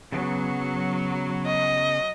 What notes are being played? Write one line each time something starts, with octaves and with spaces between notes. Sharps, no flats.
C#3 F#3 B3
D#5